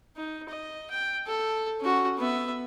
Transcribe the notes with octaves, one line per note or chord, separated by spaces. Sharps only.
D#4
D#5
G5
A4
C#4 F#4
B3 E5